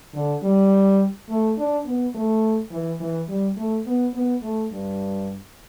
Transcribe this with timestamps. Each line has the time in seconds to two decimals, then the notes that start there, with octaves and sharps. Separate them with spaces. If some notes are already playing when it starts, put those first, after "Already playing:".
0.14 D3
0.43 G3
1.29 A3
1.57 D4
1.85 B3
2.14 A3
2.71 E3
3.00 E3
3.28 G3
3.56 A3
3.86 B3
4.14 B3
4.42 A3
4.72 G2